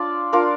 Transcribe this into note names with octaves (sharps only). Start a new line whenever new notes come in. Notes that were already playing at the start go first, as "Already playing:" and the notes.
Already playing: D4 F4 D5
D4 F4 A#4 D5